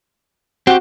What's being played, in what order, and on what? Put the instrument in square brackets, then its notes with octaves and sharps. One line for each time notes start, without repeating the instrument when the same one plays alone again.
[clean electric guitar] C4 G4 [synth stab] F#4